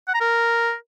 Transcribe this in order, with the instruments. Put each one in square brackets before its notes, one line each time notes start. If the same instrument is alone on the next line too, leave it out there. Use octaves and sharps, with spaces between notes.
[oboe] F#5
A#5
A#4